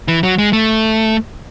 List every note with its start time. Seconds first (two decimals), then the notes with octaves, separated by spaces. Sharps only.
0.08 E3
0.23 F#3
0.38 G#3
0.53 A3